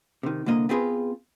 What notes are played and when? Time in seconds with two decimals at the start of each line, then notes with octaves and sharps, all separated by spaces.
0.23 C3 D#3
0.46 C2 D3 A#3 D#5
0.69 B3 C4 F4 G#4 B4